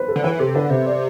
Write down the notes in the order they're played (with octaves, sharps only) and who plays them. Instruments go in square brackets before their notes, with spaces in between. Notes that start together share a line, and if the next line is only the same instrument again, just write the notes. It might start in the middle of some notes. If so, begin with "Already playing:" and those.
Already playing: [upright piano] B4 C5
A4
[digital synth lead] D3
[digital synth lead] E3 [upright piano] B4
[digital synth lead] C3 [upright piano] A4
[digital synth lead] D3 [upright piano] B4
[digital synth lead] C3 [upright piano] C5
[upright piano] D5